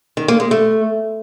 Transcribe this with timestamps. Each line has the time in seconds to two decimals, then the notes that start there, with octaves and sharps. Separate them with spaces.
0.17 D#3
0.28 A#3
0.40 G#3
0.51 A3